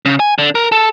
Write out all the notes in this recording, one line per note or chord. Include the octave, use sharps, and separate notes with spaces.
C#3
G#5
D3
A#4
A4